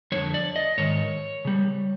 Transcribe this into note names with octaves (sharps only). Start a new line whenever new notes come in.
F2 D3 F3 C#5
D5
D#5
G#2 D#3 C#5
C#3 G3